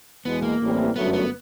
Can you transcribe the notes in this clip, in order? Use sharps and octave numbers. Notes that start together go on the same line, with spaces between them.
E2 B2 G#3 B3
A#3
A1 A2 E3 G3 C4
G1 F#2 D3 F#3 A3 B3
B3